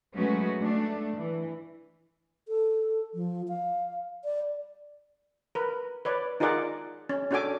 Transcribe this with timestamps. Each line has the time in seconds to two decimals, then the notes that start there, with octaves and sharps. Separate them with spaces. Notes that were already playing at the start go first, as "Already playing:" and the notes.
0.15 F#3 G#3 A3 B3 C#4 F#4
0.60 A3 D4
1.16 E3
2.48 A4
3.14 F3
3.48 F5
4.24 D5
5.55 A#4 B4
6.05 B4 C#5 D5
6.40 D#4 F4 G#4 A#4 D5 F#5
7.09 C#4
7.31 C#4 D4 F#4 A4 G#5 D6